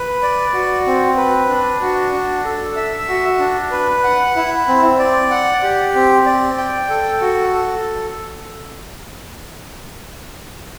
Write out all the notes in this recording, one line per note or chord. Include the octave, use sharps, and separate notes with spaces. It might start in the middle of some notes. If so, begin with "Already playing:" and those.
Already playing: B4
D5
F#4
C4
B4
D4
F#4
D4
A4
E5
F#4
D4
B4
F#5
E4
C4
D5
F#5
G4
C4
D5
G5
A4
F#4
A4